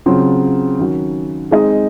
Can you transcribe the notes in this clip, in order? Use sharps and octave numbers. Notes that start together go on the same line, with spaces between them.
C#3 F#3 C4 F4
D#3 F#3 C#4 F#4
G#3 C4 D#4 G#4 D#5